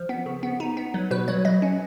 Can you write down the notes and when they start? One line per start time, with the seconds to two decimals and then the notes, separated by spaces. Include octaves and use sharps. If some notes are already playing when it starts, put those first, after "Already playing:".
Already playing: F3
0.09 B3
0.26 C#3
0.43 B3
0.60 D#4
0.77 B3
0.94 F#3
1.11 B2 B4
1.28 F#3 C#5
1.45 F#3 D#5
1.62 C#4